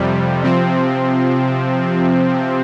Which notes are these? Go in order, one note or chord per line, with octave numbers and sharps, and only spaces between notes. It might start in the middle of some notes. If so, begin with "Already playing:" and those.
Already playing: F2 C3 G3
C3 F3 C4